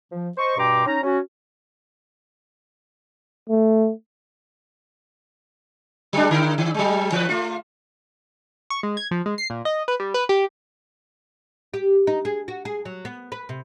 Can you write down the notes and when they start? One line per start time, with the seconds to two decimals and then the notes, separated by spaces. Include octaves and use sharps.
0.12 F3
0.38 C5 D#5 C#6
0.57 G2 B2 G5 A#5 C6 D6
0.87 C#4 D#4 A#5
1.03 C#4 F#4
3.49 A3
6.13 F#3 G#3 D4
6.31 D3 E4 A#4
6.58 D#3
6.74 F#3 G#3
7.12 E3 B4
7.29 A3 F4
8.70 C#6
8.83 G#3
8.97 G#6
9.11 F3
9.26 G#3
9.38 C7
9.50 A#2
9.65 D#5
9.88 B4
10.00 G3
10.14 B4
10.29 G4
11.74 G4
12.07 D#4
12.25 G#4
12.48 F#4
12.65 G#4
12.85 F#3
13.05 B3
13.32 B4
13.49 C3